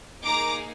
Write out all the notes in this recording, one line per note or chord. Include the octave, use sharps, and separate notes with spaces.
A#3 D#4 G#4 A#5 D6